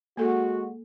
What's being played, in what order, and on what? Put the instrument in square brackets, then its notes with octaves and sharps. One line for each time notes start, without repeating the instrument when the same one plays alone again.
[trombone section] G#3 F#4 [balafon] A#3 A4